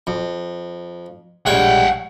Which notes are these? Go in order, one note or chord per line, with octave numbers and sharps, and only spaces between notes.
F2
A#1 G3 G#3 C#5 F#5 G5